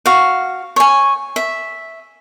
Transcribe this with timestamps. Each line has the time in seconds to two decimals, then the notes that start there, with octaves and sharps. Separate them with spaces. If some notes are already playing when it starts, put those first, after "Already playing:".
0.06 F#4 F5
0.76 C#5 G#5
1.36 E5